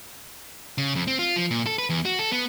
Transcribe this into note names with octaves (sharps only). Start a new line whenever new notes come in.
C#3
F2
C4
F4
F3
A#2
A4
B4
E2
F#4
A4
B3